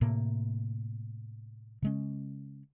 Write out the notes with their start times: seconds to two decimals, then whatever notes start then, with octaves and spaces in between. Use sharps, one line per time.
0.01 A2 C3 A#3
1.82 C#3 G#3 C#4